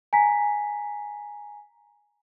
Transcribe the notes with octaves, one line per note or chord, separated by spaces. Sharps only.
G#5 A#5 B6